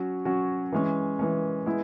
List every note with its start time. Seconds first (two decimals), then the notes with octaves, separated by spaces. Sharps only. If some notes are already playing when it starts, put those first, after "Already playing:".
Already playing: F#3 C#4 F#4
0.25 F#3 C#4 F#4
0.72 E3 G#3 C#4
1.19 E3 G#3 C#4
1.66 G#3 B3 E4